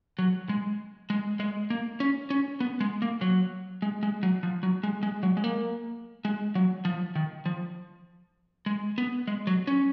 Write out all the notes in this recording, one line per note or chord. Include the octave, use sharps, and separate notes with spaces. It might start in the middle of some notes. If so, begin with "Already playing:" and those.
F#3
G#3
G#3
G#3
A#3
C#4
C#4
B3
G#3
A#3
F#3
G#3
G#3
F#3
F3
F#3
G#3
G#3
F#3
G#3
A#3
G#3
F#3
F3
D#3
F3
G#3
B3
G#3
F#3
C#4